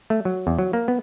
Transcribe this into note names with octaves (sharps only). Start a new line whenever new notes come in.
A3
F#3
E2
F#3
A#3
B3